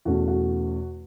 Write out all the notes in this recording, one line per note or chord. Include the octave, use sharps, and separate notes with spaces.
E2 B2 A3 C#4 F#4
F#4